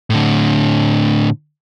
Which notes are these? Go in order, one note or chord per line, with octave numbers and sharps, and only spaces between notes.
A2 D3